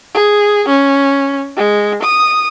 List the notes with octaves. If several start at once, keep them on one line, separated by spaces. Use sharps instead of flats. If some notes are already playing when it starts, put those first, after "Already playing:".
G#4
C#4
G#3
D#6